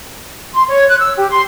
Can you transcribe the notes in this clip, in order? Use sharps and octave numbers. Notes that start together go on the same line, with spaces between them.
C6
C#5
F#6
E6
G4
C6